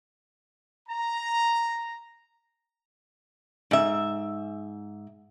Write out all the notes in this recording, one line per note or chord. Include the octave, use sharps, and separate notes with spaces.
A#5
G#2 E5